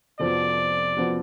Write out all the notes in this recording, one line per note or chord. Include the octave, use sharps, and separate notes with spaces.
F1 F2 F3 B3 F#4 D5
F3 B3 F#4